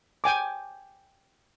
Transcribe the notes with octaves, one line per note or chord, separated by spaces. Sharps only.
G5 G#5 D6